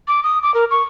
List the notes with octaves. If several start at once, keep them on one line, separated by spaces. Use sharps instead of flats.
D6
D#6
D6
A#4
C#6